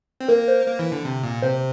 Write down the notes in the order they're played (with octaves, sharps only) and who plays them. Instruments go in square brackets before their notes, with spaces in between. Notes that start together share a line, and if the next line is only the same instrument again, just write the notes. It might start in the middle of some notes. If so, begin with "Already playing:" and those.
[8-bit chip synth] C4
[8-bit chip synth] A#3 [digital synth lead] A#4
[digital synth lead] C5
[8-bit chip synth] A#3
E3
D3
C3
A#2
[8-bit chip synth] C3 [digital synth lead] C5